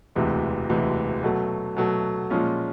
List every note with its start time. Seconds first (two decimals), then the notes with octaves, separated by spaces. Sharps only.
0.15 E1 D2 C3 E3 G#3
0.69 E1 D2 C3 E3 G#3
1.23 B2 F#3 A3
1.76 B2 F#3 A3
2.30 A#2 F3 G#3 C#4 F4